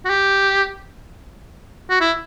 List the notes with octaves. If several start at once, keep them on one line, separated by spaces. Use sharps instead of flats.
F#4
G4
F#4
E4